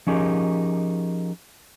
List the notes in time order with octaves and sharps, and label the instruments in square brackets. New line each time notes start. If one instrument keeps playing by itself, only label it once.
[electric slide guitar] F3 C#4 D#4 G4 G#4 A#4